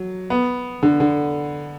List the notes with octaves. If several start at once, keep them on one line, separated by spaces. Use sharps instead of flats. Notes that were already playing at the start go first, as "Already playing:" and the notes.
Already playing: F#3
B3
D3
D3